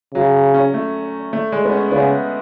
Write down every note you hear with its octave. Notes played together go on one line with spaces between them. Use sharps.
C#3 F#3
C#4
A3
A3
G#3
B3
C#4
C#3 B3